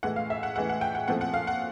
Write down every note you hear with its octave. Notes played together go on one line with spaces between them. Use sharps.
A2 E3 G#3 F#5
F5
E5
F#5
A2 E3 G#3 F#5
F#5
G5
F#5
A#2 F3 A3 C4 F#5
F#5
F5
F#5